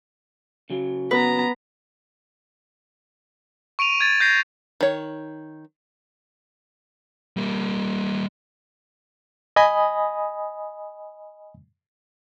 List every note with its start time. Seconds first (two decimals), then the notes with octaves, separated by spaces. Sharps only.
0.70 C#3 F#3
1.11 B3 B4 A#5
3.79 C#6 D7 D#7 F7
4.01 G#6 A6
4.20 G6 A#6 C7
4.81 D#3 C#5
7.37 G3 A#3
9.56 D#5 G#5 B5 D#6